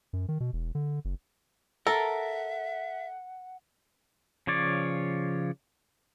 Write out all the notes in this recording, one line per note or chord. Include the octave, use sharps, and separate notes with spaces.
F#2
D#3
B2
E1
D3
F#1
A4 A#4 E5 F#5
C#3 F3 C#5 D5